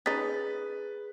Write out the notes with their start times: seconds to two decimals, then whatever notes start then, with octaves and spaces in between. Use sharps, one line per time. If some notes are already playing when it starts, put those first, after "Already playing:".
0.06 C#4 D#4 G#4 B4 D#6 A6 B6